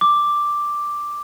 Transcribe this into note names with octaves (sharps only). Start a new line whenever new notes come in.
D6